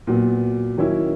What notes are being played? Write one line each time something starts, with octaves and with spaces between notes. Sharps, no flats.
A#2 F#3 B3
D#3 F#3 C#4 E4